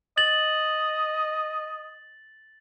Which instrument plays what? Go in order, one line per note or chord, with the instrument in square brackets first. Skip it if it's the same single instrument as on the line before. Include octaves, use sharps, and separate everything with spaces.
[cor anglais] D#5 [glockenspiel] A6 F#7